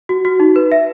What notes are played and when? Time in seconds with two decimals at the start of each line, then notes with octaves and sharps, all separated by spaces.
0.09 F#4
0.25 F#4
0.40 D#4
0.56 B4
0.72 E5